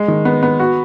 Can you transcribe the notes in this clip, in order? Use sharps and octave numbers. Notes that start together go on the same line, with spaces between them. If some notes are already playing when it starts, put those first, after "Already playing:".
Already playing: G#3
D#3
B3
B3
F#4